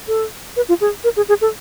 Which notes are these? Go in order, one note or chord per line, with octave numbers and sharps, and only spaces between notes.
A4
B4
F4
G#4
A#4
G#4
G#4
A4